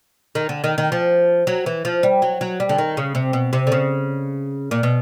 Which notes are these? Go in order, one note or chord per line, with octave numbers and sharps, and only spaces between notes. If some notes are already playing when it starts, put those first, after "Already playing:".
D#3
D3
D#3
D#3
F3
F#3
E3
F3
G3
F#3
F#3
G3
D3
D#3
C#3
C3
B2
C3
D3
C#3
A#2
B2